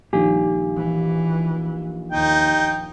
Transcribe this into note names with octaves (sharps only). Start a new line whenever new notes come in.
A#1 D#3 G3 G4 G#5
E3
D#2 D#4 G5